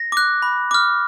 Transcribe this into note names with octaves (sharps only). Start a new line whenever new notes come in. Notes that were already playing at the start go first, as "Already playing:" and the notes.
Already playing: A#6
D6 F#6
B5
D6 F6